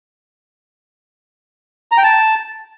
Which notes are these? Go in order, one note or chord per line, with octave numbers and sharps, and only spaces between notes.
A#5
G5
A5